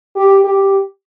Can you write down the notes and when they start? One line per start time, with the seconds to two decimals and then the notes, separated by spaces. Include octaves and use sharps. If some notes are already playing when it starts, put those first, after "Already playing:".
0.16 G4
0.45 G4